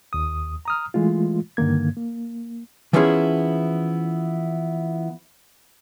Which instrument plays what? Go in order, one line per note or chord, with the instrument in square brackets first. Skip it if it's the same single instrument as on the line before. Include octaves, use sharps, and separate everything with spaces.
[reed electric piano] D#2 D#6
A#5 D#6 F6
E3 G#3 A3 F4
G2 D3 D#3 A#3 G#6
A#3
[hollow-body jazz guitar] E3 F3 B3 C#4 E4 G#4